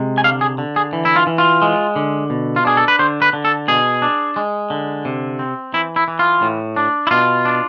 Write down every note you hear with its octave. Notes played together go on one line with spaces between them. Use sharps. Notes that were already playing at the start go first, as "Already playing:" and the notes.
Already playing: C3 G#3
G#5
D3 F5
G#4
D3
G#4
E3
E4
F4
E3
F4
G#3
D3
B2
F4
D4 G#4
A4
B4
D3 C5
B4
D3
A4
B2 G#4
D4
G#3
D3
C3
C4
E3 E4
E4
E3
F4
A2
D4
E4
B2 F4
D4